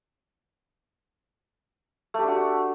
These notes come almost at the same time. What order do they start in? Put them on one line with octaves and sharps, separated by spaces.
A3 G4 D4 F#4